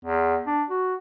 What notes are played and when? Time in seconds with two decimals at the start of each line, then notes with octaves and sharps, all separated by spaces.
0.05 E2
0.47 D4
0.70 F#4